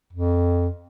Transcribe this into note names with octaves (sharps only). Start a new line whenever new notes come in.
F2